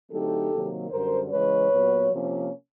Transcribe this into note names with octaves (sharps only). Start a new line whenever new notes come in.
D3 F#3 A3 C4 D#4 G4 A4
C3 D#3 F#3 A#3
F#2 D3 G3 A#4 C5
C#3 E3 G#3 B4 C#5
A#2 F#3 B3
C3 F3 A#3 C#4